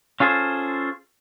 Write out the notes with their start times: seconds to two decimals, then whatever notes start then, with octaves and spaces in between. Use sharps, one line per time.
0.20 C#4 F4 G#4 A4 C5